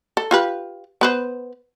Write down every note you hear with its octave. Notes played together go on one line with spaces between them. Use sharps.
A4
F4 G4 B4
B3 B4 C5